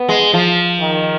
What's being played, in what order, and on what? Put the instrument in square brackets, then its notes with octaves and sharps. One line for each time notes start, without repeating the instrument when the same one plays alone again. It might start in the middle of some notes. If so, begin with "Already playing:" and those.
Already playing: [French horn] B3
[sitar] G#3
F3
[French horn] D#3